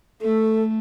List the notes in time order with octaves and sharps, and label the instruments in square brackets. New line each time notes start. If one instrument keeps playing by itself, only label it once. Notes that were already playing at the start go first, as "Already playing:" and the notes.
[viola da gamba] A3 [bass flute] A4